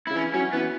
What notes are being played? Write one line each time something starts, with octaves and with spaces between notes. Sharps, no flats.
C#3 E4
E3 C#4
F#3 C#4
E3 B3